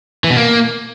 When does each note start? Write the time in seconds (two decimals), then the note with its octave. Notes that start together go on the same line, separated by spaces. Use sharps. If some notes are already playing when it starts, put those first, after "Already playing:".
0.24 E3
0.30 B2
0.37 A#3